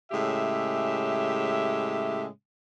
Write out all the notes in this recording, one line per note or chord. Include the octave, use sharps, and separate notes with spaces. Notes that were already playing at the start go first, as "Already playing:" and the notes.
A2 C#3 G#3 G4 E5